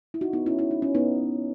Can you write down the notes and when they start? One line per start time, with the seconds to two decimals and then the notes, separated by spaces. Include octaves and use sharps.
0.14 E4
0.21 D#4 F#4
0.33 B3 D#4
0.46 C#4 E4
0.59 E4
0.71 D#4
0.82 C#4
0.95 B3 D#4